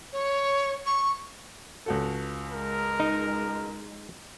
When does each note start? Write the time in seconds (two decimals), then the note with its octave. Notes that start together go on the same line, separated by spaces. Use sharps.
0.13 C#5
0.86 C#6
1.86 C#2 F#4 A4
2.52 G#3 A#4
3.00 D#4